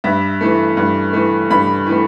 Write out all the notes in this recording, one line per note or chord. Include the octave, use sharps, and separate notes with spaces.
G2 E5
E3 A3
G2
E3 A3
G2 B5
E3 A3